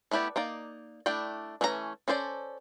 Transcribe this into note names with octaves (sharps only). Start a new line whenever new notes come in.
A3 B3 E4 G4 D5
A#3 D#4 D5
A3 D4 E4 D5 G5
E3 A3 C#4 D4 A#5
C#4 A4 C5 D5